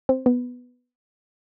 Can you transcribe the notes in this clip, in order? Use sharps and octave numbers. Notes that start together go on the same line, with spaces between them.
C4
B3